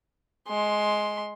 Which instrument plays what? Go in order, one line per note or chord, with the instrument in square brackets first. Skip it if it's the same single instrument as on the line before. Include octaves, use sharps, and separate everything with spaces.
[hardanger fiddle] G#3 C6